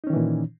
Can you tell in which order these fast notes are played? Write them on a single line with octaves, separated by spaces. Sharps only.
D#4 C#4 D#3 E3 A#2